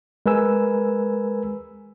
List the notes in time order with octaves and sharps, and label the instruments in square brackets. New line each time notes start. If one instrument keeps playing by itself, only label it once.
[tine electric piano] G#3 A#4 B4 G#5 E6